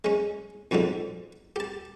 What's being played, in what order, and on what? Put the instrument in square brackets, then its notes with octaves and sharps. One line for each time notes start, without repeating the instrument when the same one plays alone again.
[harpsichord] G#3 C#4
F2 G#2 B2 D3 F3
G4 A5